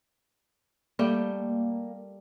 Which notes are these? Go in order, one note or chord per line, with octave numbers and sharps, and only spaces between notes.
G3 A3 A#3 G5